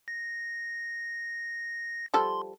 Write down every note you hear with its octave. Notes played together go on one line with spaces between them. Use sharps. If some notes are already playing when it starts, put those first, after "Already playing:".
A#6
F3 G3 A4 C6